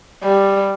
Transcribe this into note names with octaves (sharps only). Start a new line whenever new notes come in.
G3